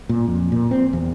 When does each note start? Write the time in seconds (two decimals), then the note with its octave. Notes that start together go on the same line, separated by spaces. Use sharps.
0.09 A#2
0.27 F2
0.52 A#2
0.71 C4
0.93 E2